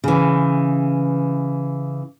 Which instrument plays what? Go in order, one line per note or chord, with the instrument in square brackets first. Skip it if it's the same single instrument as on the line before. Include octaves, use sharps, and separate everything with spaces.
[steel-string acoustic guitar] C#3 E3